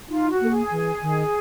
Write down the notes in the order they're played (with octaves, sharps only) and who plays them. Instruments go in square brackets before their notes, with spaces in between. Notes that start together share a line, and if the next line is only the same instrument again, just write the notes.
[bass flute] D#4 [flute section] F4
[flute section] F#4
[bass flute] A#3 [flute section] A4
[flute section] G#4
[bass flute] E3
D#3